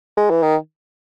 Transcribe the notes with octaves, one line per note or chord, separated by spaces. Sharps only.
G#3
E3
D#3